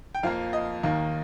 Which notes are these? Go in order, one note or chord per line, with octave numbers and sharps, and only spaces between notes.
G5
F2 F3 A#3 F5
D#5
D#2 D#3 A#3